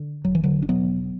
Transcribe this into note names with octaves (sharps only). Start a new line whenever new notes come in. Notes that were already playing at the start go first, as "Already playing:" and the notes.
Already playing: D3
E1 F#3
E3
D3 F#3
D4
B2 F#3 B3